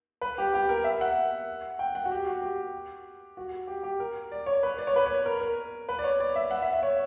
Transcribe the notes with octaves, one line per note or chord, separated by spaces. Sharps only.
B4
G4
G4
A#4
E5
F#5
G5
F#5
F#4
G4
F#4
G4
F#4
G4
G4
A#4
D5
C#5
B4
D5
C#5
B4
C#5
A#4
A#4
B4
D5
C#5
D5
E5
F#5
E5
E5
C#5